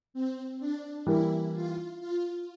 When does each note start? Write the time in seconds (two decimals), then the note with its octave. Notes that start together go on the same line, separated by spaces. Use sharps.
0.14 C4
0.60 D4
1.06 E3 G3 A#3 E4
1.54 F4
2.00 F4